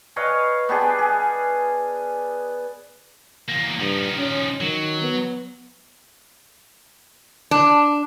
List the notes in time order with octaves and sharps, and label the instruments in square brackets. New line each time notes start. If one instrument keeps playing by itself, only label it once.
[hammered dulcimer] B4 C#5 D#5 F5
B3 D4 G4 G#4
G#4
[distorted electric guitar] E2 A#3
[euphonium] G2 [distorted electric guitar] F3 D#4
[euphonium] C#4
[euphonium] D#3 [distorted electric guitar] F#3
[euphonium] B3
[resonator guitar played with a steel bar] D4